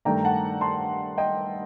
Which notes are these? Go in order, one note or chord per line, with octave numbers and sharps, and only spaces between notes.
G2 D#3 A3 D4 G5 A#5
F#5 A5
A5 C6
D#5 G5